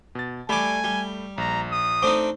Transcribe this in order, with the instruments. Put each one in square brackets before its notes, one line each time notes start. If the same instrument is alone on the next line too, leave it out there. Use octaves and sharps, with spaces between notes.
[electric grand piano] B2 A6
[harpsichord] G3 D5 [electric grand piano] A3 B5 [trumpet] G#5
[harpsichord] G3
[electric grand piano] A#1 [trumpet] A#5
[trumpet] D#6
[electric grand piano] A3 D6 [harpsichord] C4 D4 D#4